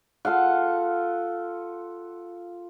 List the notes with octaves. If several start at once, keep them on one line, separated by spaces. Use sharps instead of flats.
F4 A4 F5 F#5